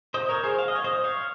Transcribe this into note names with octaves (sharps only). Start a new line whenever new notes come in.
C5 D#5
A#4 C#5
G#4 C5
F5
D#5
C#5
C5 D#5
C#5 F5